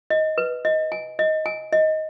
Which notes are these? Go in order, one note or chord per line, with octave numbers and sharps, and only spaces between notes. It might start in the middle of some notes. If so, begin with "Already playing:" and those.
D#5
B4
D#5
G#5
D#5
G#5
D#5